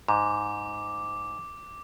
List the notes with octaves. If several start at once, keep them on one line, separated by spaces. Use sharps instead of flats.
G#2 D6